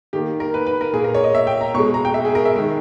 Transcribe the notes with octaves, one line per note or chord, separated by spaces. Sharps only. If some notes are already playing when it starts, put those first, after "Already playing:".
D#3 A#3 G4
A#4
B4
B4
A#4
A#2 A#3 G#4
A#4
C#5
D#5
E5
G5
A#5
B2 G#3 C#6
A#5
G5
E5
G#4
A#4
E5
D#3 G#3